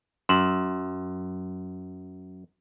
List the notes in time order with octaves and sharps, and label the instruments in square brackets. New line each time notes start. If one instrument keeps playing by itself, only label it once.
[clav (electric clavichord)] F#2 [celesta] C6 E7 F#7